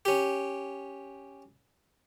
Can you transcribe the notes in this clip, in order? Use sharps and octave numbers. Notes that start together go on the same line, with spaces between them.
C#4 G4